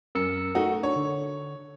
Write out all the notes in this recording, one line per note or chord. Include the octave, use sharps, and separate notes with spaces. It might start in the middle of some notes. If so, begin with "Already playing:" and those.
F#2 A#4 E6 C#7
A3 D#4 F#4
D4 C#5
D3